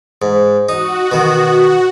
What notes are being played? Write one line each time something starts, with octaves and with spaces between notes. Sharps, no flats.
G#2
D#4 F#4
B2 D#3